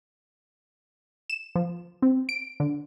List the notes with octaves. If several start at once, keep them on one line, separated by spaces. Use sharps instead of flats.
E7
F3
C4
D7
D3